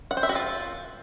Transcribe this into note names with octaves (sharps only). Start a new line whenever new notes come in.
F#5
C5
E5
F#4
F4